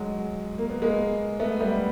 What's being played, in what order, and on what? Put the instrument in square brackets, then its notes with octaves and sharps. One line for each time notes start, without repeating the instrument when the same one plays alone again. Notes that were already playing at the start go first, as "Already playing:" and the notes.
Already playing: [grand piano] F#3 G#3
A#3
B3
G#3 A#3
A3 B3
G3 A3